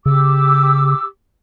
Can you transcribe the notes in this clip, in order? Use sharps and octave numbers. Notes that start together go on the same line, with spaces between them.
C#3 G4 D6 E6